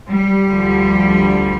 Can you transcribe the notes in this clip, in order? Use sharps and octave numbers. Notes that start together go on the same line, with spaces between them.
G3
D2 D3 F3